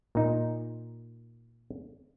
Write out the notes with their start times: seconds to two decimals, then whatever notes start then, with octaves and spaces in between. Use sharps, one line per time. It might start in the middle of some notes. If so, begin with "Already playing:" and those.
0.15 A#2 D#4